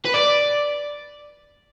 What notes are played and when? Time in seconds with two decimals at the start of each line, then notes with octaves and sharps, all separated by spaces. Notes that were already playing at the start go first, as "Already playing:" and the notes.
0.05 B4
0.14 D5